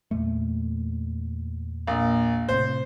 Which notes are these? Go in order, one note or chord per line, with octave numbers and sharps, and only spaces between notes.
E2 A#2 A3
A#1
A2 C3 C5